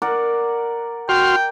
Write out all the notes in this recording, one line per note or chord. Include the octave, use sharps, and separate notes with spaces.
A#4 D5 F#5
F#4 G5 C6 F6